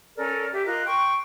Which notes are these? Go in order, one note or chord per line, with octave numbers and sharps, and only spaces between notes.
C#4 A4 A#4 D5
G4 E5
F4 A#4 D#5 F#6
G5 C6 C#6